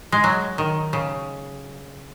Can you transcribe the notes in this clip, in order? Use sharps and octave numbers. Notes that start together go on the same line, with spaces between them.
G#3
F#3
D#3
C#3